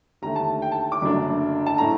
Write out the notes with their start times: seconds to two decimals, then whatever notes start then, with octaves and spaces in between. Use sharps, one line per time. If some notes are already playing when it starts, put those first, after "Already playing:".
0.22 D#2 D3 A3 A#5
0.36 A5
0.62 G5
0.72 A5
0.92 D6
1.02 F#1 F#2 D3 A3 D4
1.66 A5
1.78 A2 A3 A#5